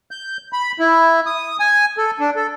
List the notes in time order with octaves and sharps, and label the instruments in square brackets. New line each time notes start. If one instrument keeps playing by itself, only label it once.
[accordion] G6
B5
E4
D#6
G#5
A4
D4
A4